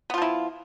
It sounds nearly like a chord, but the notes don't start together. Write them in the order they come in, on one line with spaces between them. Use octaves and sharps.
B3 F4 F3 E4